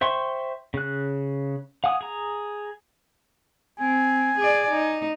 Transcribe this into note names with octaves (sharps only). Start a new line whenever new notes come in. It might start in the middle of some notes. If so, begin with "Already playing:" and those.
C5 E5 G5 C6 C#6
C#3 F#6
F5 F#5 G#5 D#6
G#4 A#5
C4 G#5
G#4 D5
D#4